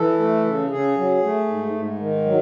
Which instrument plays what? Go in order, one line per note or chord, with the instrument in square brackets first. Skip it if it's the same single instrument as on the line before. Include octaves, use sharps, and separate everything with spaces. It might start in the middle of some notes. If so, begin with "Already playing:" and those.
Already playing: [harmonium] E3 A4
A3
C#3
C#3 G#4
F#3
A3
G#2
G#2
D#3
F#3